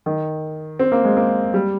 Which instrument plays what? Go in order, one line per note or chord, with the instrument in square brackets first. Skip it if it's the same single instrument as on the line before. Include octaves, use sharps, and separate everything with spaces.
[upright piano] D#3
C4
A#3
G#3
A#3
G3